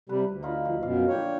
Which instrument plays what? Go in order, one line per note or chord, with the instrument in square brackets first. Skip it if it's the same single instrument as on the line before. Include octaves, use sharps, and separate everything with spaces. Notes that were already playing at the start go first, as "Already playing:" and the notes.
[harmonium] C3 G3 [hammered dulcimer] B4
[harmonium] D2
[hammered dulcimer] D#4 F4 B5
F3
[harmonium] F#2 B2 [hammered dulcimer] F5
[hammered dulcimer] A#2 D3 G5 [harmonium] C#5